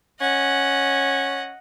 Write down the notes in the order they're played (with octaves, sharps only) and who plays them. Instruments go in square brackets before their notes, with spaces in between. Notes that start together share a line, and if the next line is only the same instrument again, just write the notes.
[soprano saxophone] C#4 [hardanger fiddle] D#5 F#5